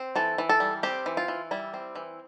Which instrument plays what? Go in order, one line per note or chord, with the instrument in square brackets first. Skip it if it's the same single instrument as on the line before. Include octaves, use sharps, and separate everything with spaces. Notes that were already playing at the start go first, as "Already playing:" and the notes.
Already playing: [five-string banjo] C4
E3 A4
E3
A4
G3
C4 G4
E3
F4
E3
G3 E4
C4
E3